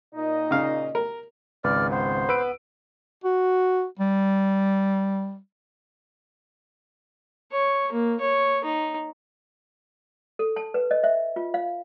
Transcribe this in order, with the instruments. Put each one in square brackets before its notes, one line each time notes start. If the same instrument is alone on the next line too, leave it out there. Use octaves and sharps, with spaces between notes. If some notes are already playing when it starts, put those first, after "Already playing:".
[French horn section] A#2 D#5 [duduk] D#4
[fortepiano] C#3 F5
A#4
[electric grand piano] G#1 C#2 B4 [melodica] D5 [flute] F6
[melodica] B3 [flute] C5
[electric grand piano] B4 E6 D7
[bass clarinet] F#4
G3
[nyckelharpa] C#5
A#3
C#5
D#4
[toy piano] A4
A5
B4
D#5
E5
F4
F5